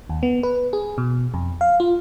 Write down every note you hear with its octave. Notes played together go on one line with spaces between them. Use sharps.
D#2
B3
B4
G#4
B2
F2
F5
F4